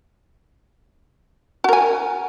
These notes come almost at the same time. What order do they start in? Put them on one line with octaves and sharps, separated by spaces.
F#4 A#4 G#5